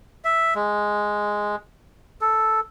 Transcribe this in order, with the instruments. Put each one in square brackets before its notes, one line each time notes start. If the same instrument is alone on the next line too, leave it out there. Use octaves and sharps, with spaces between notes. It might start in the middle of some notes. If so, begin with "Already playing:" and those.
[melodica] E5
G#3
A4